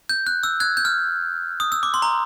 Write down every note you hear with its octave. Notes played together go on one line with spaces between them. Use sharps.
G6
F#6
E6
F#6 G#6
G6
F6
D#6
E6
D6
C6
A#5